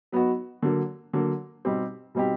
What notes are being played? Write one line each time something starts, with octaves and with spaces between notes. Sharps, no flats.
F#3 B3 D#4 F#4
D3 F#3 A#3
D3 F#3 A#3
B2 G3 C4 D#4 G4
B2 G3 C4 D#4 G4